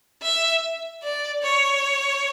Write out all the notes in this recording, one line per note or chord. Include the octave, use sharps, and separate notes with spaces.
E5
D5
C#5